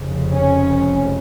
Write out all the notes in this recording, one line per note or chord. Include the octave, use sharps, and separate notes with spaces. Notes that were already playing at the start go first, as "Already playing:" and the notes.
Already playing: F1 F2 C#3
C#4